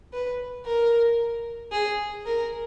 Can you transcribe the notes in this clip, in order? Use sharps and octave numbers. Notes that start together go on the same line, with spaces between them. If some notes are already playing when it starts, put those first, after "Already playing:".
B4
A#4
G#4
A#4